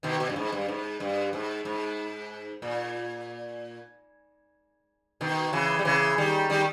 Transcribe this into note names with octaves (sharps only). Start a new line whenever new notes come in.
B2 D#3
B2
G2
G#2
G2
G#2
G2
G#2
G#2
A#2
B2 D#3
C#3 E3
G3
C#3 E3
D#3 G3
D#3 G3